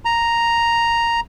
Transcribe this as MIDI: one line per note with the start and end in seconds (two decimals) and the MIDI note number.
0.05 1.20 82